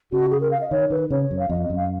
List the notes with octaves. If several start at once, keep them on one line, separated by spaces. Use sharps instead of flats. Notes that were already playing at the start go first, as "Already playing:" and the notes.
C#3 F#4
G#4
A#4
F5
D#5
D#3 C#5
D#3 B4
C#3 C#5
F#2
F5
F2 D#5
D#5
F#2
F5